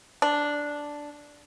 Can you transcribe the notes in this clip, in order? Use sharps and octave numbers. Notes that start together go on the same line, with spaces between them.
D4